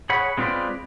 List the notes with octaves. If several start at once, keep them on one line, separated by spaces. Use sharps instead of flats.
G#4 C#5 F#5 B5
G#3 C4 F4 B4 D5